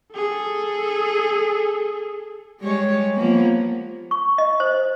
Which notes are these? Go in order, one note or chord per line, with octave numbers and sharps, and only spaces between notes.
G#4 A4
G3 G#3 C#5
F3 A#3 B3
C#6
D#5
C5